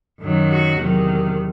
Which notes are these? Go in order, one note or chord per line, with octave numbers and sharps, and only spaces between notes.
F#2 D#3 F#3
F#4
E2 C3 D#3 F#3